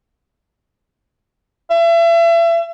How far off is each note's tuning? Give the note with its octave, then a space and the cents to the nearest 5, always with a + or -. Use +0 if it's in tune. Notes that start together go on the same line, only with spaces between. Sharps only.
E5 +35